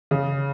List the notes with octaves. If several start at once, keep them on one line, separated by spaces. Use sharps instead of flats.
C#3